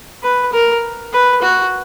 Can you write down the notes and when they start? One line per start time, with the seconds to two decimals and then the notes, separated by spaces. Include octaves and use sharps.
0.23 B4
0.53 A#4
1.13 B4
1.42 F#4